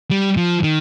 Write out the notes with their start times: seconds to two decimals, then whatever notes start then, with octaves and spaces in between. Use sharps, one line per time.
0.11 G3
0.37 F3
0.63 D#3